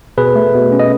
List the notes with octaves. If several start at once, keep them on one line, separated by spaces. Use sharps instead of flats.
B2 G#4 B4
A3
B2
C#4
D#5